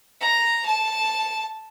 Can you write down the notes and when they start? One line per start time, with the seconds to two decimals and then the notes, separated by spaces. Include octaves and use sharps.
0.21 A#5
0.65 A5